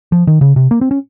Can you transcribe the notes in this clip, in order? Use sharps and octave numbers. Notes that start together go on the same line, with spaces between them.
F3
D#3
C#3
C3
A#3
C4
C#4